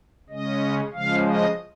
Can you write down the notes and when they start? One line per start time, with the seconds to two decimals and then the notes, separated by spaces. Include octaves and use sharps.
0.29 C#3 G#3 C#4 D#5
0.93 C#3 F3 G#3 F5
1.25 D#5